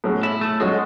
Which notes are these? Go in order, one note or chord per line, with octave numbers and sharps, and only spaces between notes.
A2 F#3 C#4 G#4
E4
A3
F#3 G#3 C#4 F#4 A4